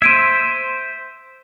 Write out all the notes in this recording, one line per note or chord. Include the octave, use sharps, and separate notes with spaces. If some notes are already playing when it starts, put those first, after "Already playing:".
C5 E5 G#6 D7 D#7